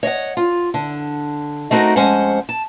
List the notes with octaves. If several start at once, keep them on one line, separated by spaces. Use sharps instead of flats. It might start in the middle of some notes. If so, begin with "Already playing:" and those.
C#5 D#5 F5 F#5
F4
D3
A3 C4 D#4 F#4 A#4
F2 G#3 C#4 C5 F#5
A5